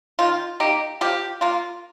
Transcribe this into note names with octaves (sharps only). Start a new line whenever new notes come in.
D#3 F4
A#3 D#4 G4
F3 G4
A#3 F4